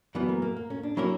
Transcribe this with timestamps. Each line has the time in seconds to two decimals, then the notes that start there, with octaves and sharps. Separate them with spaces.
0.15 F#2 E3 G3 B3
0.29 A#3
0.42 A#3
0.57 A#3
0.70 C#4
0.83 D4
0.97 F#3 A#3 C#4 E4 F#4 A#4